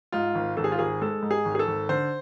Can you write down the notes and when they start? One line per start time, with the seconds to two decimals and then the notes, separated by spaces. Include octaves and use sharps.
0.12 G#2 F4
0.35 G#1
0.57 G#1 A4
0.64 G#4
0.72 F4
0.79 G#1 G#4
1.01 G#3 A4
1.22 G#2
1.31 G#4
1.45 G#1
1.55 G#4
1.59 A4
1.67 G#1
1.89 D3 C5